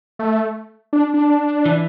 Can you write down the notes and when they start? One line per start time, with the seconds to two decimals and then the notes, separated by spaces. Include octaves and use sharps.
0.19 A3
0.93 D4
1.14 D4
1.66 E3